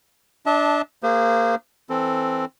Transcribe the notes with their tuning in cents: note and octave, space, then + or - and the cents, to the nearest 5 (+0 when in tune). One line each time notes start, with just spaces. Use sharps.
D4 +0 E5 -45 A5 -10
A#3 -20 G#4 -40 C5 -30
E3 +0 C4 +0 A4 +0